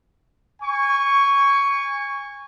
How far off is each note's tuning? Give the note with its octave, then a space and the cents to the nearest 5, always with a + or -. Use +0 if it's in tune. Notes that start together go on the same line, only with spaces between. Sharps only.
G#5 -20 C#6 +10